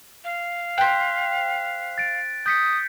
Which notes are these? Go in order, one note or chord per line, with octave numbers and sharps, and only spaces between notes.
F5
C5 G5 F#6 B6
A6 D7
D#6 G6 B6 C#7